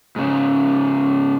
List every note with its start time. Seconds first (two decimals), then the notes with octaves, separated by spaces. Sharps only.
0.16 G#2 C#3